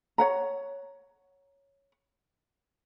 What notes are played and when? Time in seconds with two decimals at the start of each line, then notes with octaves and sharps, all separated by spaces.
0.18 C#5 F#5 A#5